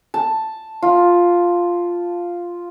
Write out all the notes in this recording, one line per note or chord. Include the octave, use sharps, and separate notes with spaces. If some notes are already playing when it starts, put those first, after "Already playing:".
A5
F4